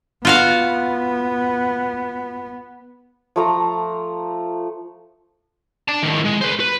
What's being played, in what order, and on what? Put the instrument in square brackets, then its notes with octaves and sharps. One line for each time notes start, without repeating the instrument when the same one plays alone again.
[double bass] B3 [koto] F4 F#4 F5
[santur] F3 A3 A#5
[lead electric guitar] D5 A5
A2 D#3
G#3
B4 C5
B4